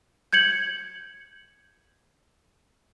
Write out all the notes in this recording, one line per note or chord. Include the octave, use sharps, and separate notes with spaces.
G6 G#6 C#7 F#7